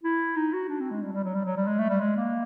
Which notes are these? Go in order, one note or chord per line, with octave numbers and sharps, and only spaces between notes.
E4
D#4
F#4
D4
C4
G#3
G3
G3
F#3
G3
F#3
G3
G#3
A3
G3
G#3
A#3